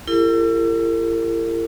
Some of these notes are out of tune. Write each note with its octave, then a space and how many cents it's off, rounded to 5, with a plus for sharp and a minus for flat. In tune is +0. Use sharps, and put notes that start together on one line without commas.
E4 +40 G4 +30 A#4 -45